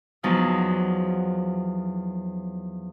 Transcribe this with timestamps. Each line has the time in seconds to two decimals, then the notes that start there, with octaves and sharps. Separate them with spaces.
0.23 E2 F3 F#3 D#4 D5 D#6